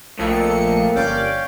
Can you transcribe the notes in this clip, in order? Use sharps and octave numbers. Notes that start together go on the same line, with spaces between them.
A#1 F2 A3 A#3 C#7
G1 C#4 D5 F5 G5